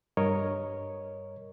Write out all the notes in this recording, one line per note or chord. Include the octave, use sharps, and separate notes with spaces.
G2 A#4 C#5 D#5